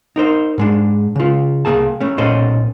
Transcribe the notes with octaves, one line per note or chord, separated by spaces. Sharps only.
D#4 A#4 C5
G#2 G#3 D4
C#3 F4
C2 C3 A#3 G#4 A5
A3 C#4
B1 A#2 C#4 A4 C5 D#5